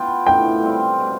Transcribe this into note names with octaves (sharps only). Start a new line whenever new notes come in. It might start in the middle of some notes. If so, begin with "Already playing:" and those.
Already playing: B3 F4 G5
A2 G5
G3 C4 F4
B2